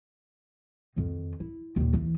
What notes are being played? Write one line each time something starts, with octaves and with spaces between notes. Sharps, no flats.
F2 D#3
E4
D#2 A#2
E3